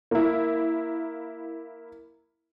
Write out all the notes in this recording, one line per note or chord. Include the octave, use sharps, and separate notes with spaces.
A#3 E4